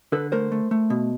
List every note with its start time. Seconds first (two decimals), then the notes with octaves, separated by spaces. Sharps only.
0.12 D3 A4 B4
0.32 A3 A#4 C5
0.52 A3
0.71 A3
0.90 B2